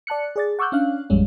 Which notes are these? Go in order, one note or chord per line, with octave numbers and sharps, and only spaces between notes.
D5 A5 F#6 C#7
G#4 D5 A6
F#5 C#6 D6 E6 F#6 G6
C#4 D4 F5 F#6
A1 F2 G3 G#3 C#4